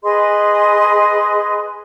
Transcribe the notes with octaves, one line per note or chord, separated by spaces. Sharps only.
G#4 B4 D#5 C6